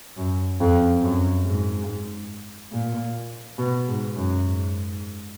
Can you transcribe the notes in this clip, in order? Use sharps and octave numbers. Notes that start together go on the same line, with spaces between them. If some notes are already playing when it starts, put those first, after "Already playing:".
F#2
F2
F#2
G#2
A#2
B2
G#2
F#2
G#2